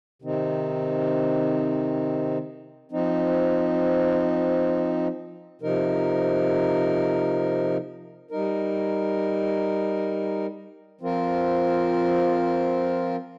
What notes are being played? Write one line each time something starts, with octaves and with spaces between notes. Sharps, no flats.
C3 D#3 C4 D#4
F3 C4 D#4
C3 F3 D#4 A#4
G3 D#4 A#4
F3 C4 F4 A#4